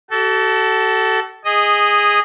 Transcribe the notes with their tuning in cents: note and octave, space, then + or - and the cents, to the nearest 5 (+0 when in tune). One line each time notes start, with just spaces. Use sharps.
F#4 +40 A4 +0
G#4 -15 D#5 +0